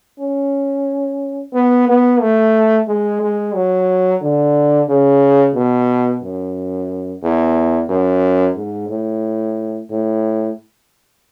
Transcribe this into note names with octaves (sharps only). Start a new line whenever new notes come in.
C#4
B3
B3
A3
G#3
G#3
F#3
D3
C#3
B2
F#2
E2
F#2
G#2
A2
A2